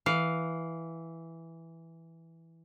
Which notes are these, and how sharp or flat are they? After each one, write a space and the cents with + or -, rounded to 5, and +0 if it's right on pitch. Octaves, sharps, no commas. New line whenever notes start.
E3 +0 F5 +5